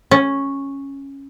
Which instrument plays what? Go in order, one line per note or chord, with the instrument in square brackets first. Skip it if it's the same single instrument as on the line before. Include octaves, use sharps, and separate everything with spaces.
[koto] C#4